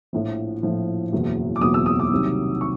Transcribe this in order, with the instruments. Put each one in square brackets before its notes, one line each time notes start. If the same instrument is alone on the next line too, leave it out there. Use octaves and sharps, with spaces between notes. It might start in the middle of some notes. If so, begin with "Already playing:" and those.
[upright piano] A#1 A2 F3
A#1 A2 F3
F#1 E2 B2 F#3
D6
F#1 E2 B2 F#3 D#6
E6
D#6
D6
C2 C3 D#3 F#3
C#6